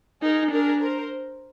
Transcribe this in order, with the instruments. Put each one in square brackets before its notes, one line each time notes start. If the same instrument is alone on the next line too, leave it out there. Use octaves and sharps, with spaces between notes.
[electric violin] D#4 [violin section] G#4 A#4
[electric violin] D4 [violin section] G#4 A#4
[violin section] A#4 C5